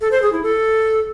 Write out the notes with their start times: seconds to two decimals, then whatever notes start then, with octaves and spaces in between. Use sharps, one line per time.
0.01 A4
0.11 C5
0.22 G#4
0.32 E4
0.43 A4